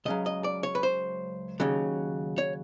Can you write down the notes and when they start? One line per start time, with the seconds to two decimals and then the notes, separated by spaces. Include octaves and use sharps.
0.05 C#2 C#3 F#3 D#5
0.26 D#5
0.44 D5
0.63 C#5
0.75 B4
0.83 C5
1.60 D#2 C#3 F#3
2.38 C#5